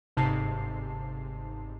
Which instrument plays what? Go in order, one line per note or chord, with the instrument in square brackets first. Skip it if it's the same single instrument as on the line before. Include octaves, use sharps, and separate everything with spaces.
[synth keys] G1 G#2 C3 D#4 A5 C7